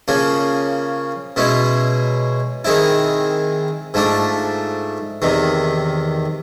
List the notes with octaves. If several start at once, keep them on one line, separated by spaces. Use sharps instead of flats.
C#3 F3 A#3 C#4
B2 G#3 C#4 E4
D#3 G#3 C4 E4
G#2 F3 A3 D4
E2 C3 D#3